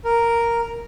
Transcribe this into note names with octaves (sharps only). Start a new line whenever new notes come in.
A#4